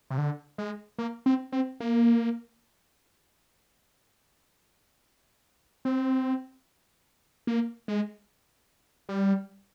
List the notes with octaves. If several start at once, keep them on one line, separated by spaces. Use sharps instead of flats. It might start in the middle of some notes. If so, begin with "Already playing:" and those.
C3
D3
G#3
A#3
C4
C4
A#3
C4
A#3
G#3
G3